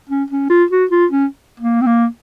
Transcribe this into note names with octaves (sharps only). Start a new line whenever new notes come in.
C#4
C#4
F4
F#4
F4
C#4
A#3
C4
A#3